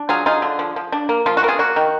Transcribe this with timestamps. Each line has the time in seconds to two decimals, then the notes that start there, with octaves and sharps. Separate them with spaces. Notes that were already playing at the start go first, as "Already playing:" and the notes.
Already playing: D4
0.09 F#3 F4 G#4
0.26 D#4 F4 G#4
0.42 D3
0.59 F3
0.76 F3
0.92 D4
1.09 A#3
1.26 F3 F4
1.37 F#4
1.43 B3 A#4
1.48 F4 G#4
1.59 A#3 F#4
1.76 D#3